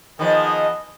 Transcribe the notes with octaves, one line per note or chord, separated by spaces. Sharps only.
D#3 F3 B3 G#4 D#5